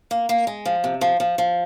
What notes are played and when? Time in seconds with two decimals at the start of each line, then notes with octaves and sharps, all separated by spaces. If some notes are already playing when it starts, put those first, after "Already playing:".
0.11 A#3
0.29 A#3
0.47 G#3
0.66 F3
0.84 C3
1.01 F3
1.20 F3
1.38 F3